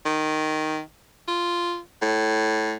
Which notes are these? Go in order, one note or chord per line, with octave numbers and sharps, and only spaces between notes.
D#3
F4
A2